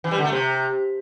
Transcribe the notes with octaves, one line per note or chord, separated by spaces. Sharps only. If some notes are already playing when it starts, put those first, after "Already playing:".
E3
G3
D3
A3
C3